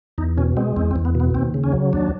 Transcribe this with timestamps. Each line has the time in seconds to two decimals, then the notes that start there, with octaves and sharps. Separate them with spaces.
0.18 E2 D#4
0.37 B2 C#4
0.57 G#3 C4
0.76 E2 C4
0.91 C4
0.96 E2
1.05 B3
1.15 B2 B3
1.34 D#2 C4
1.54 C#3
1.64 C#4
1.73 F#3
1.93 D#2 D4